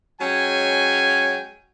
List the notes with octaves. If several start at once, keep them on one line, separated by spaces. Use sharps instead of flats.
F#3 G#3 C#4 G5 G#5